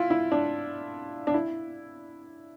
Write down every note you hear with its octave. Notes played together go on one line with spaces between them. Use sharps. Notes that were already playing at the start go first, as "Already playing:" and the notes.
Already playing: E4 F4
E4
D4
D4
E4